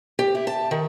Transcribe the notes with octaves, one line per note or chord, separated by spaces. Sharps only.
G4
E4
A5
D#3